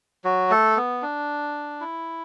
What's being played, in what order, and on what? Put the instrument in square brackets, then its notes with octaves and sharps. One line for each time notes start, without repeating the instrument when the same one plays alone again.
[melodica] F#3 F#4
A3 A4
B3
D4
E4